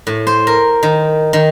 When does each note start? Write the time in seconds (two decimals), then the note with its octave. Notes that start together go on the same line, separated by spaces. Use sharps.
0.07 A2
0.27 C5
0.47 A#4
0.83 D#3
1.33 D#3